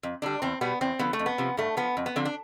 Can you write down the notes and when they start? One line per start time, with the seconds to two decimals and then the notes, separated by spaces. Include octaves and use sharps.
0.03 F2
0.22 D3 G3 D4
0.42 E2 C4
0.61 B2 G3 B3
0.81 E2 C4
0.99 D3 F3 B3
1.13 A3
1.19 F2
1.26 B3
1.38 C3 F3
1.57 G2 A3
1.77 F3 B3
1.97 F2
2.06 B3
2.16 D3 F3 C4
2.25 D4